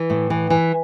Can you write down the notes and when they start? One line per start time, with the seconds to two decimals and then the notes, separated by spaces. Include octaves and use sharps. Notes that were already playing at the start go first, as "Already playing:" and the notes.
Already playing: E3
0.10 A2
0.30 E3
0.50 E3